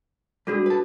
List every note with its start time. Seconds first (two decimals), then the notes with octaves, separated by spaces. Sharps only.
0.47 G3 G#3 D4 F#4 G#4 A4
0.66 B4 A5